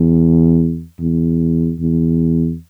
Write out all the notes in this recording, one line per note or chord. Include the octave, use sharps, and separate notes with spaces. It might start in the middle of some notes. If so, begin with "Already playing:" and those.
Already playing: E2
E2
E2